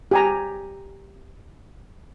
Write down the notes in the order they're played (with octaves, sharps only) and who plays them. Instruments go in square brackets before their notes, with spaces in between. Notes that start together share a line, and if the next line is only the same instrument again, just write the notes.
[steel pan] G4 G#5 A#5